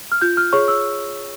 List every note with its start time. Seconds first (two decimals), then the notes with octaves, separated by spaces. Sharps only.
0.12 F6
0.21 F4 G6
0.37 F6
0.53 G#4 C#5 C#6
0.68 E6